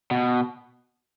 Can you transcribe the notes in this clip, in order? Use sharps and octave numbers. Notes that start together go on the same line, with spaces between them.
B2